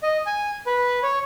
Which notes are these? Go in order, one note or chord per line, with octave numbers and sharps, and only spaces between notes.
D#5
G#5
B4
C#5